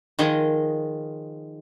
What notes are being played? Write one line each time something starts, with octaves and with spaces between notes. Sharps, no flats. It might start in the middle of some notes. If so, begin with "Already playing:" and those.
D#3 F3 G#3 G#4 D#5